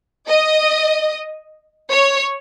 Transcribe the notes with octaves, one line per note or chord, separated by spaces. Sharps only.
D#5
C#5